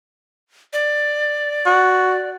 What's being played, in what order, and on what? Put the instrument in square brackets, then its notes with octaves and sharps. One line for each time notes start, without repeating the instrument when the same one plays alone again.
[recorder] D5
[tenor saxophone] F#4